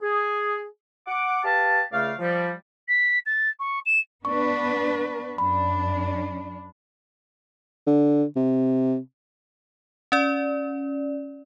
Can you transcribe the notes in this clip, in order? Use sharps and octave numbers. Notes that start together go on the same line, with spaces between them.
G#4
F#5 D6
G4 B4 F5 A5
C#2 C#3 A3 D5 F5
F3 G3
B6
A6
C#6
E7
B3 D4 B4 C#6
F#2 D4 B5
D3
C3
C#4 D5